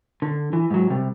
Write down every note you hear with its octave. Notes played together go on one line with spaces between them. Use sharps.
D3
E3
G#2 F#3
C3 G3